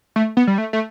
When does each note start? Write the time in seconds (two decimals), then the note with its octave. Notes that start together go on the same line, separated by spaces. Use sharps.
0.16 A3
0.37 B3
0.47 G3
0.58 A3
0.73 A3